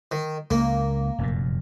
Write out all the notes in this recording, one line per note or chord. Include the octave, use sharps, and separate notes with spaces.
D#3
C#2 A#3
F1 F#2 A#2